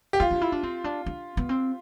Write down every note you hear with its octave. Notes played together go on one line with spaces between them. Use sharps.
G4
E4 F4
D4
E4
D4
C4
D4
D4
B3
C4